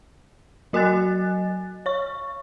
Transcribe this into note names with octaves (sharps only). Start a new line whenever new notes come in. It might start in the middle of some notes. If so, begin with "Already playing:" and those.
F#3 F#4 D#5 G#5 F#6 A6
C#5 C#6